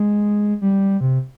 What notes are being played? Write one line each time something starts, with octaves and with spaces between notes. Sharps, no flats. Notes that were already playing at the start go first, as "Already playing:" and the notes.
Already playing: G#3
G3
C3